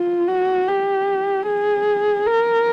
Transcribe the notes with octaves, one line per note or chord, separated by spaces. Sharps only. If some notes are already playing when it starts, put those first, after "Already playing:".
Already playing: F4
F#4
G4
G#4
A#4